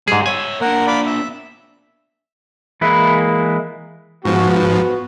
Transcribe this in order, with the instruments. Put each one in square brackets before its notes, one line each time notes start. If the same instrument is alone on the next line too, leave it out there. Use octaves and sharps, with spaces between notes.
[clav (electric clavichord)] G#2 G#4 [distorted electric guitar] D3 G3
[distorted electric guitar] C#5 E5 [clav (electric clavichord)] G#5
[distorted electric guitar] A#3 D4 [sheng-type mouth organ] A#4 F#5
[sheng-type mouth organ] D5 F5 B5
E5
[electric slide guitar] E3 G#3 A#3 E4 B4
[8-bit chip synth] G#2 F3 [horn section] B3 F#4